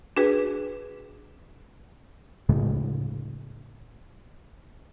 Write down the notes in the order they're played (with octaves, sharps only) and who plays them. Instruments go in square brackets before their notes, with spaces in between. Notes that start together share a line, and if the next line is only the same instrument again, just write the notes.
[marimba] D4 F#4 G#4 B4
[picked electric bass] D2 A2 C#3 G#3